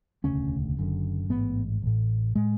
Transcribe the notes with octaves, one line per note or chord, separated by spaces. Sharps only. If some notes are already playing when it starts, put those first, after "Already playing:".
E1 D2 C#3 C#4
F#1 F#2 D3
A1 G#2 B3
A1 A2
A2 G#3